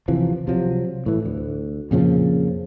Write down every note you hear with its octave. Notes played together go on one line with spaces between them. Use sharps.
C3 E3 F3
C3 F3 F#3
A2 E3
D2
F2 A#2 C#3 F3